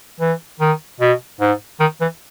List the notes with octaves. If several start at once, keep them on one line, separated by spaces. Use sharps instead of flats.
E3
D#3
B2
G#2
D#3
E3